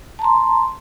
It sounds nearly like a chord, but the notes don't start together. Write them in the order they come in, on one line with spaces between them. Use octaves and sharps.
A5 A#5 C6